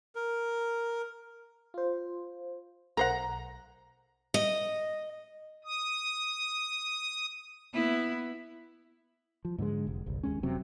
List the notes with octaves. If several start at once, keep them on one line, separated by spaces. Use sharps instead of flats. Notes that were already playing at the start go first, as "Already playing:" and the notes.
A#4
F4 C5
B1 A#4 C5 F#5 A#5
D#5
D#6
B3 E4
F3
G#2 D3 F#3 G#3
F1
G1 C2
D#2 G#3 C#4
F1 C3 F#3 C4